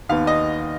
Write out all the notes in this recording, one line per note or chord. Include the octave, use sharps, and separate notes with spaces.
D#2 D#3 B3 F5
D#5